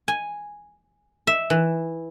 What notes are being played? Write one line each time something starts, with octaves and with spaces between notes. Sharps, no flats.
G#5
E5
E3